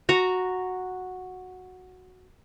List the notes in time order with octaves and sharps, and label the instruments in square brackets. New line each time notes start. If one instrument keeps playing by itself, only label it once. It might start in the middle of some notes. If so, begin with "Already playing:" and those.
[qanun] F#4 A#5